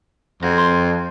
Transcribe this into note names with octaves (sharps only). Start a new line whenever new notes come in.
F2 F#4
C6